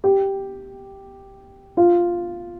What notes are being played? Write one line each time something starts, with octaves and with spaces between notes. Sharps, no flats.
G4
F4